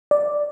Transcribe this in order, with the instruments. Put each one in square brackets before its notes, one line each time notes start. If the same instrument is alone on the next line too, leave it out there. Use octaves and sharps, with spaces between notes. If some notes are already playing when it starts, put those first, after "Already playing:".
[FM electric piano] D5